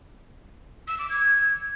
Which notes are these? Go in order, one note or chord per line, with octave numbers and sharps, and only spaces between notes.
E6
D6
G#6